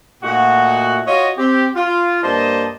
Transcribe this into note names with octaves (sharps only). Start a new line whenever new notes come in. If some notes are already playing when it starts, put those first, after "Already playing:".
A#2 A3 D#4 F#4
F4 F#4 C#5 D#5
C4 G4
F4
G2 A#3 C5 D5 D#5 A5